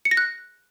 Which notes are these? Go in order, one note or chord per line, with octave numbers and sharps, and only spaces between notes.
C#7
A#6
F#6